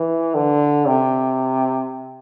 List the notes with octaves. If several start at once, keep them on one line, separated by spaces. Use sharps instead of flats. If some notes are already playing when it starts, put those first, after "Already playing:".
Already playing: E3
D3
C3